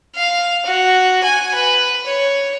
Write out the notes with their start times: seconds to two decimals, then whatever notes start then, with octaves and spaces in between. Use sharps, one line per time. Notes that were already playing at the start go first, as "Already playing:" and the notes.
0.15 F5
0.66 F#4
1.23 G#5
1.54 B4
2.06 C#5